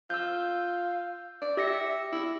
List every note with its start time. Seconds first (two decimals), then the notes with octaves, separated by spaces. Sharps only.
0.10 F4 E6 G6
1.42 D5
1.57 G4 E5 A#6 C#7
2.12 E4